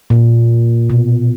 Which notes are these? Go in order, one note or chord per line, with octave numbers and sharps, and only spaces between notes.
A#2
B2